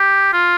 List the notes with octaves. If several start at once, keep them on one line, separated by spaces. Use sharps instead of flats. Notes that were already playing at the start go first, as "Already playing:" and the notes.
Already playing: G4
F4